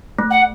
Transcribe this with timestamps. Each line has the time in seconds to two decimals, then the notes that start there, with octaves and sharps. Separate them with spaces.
0.19 A3
0.30 F#5